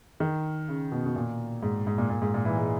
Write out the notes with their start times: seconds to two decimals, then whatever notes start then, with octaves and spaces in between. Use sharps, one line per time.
0.20 D#3
0.68 C#3
0.92 B2
1.06 B2
1.16 A#2
1.63 G#2
1.87 G#2
1.98 A#2
2.10 A#2
2.22 G#2
2.34 A#2
2.45 E3
2.58 G#3